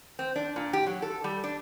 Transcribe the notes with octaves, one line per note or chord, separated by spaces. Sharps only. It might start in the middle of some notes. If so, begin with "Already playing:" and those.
C4
D4
A#2
G4
F#3
A4
G3
D4